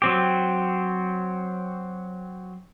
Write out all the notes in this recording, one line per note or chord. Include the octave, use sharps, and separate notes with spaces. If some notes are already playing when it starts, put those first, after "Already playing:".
F#3 C4 G4